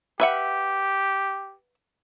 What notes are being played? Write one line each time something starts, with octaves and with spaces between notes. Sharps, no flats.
G4 B4 E5 F#5